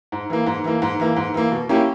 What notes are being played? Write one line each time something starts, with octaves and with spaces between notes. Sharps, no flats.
G#2
E3 A#3
G#2
E3 A#3
G#2
E3 A#3
G#2
E3 A#3
B2
A#3 C#4 E4 G4